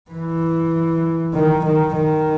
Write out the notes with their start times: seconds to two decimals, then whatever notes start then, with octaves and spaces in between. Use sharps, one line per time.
0.11 E3
1.34 D#3
1.64 D#3
1.94 D#3